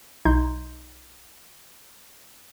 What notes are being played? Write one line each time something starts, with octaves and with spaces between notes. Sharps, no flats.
B1 D#4 C6 G6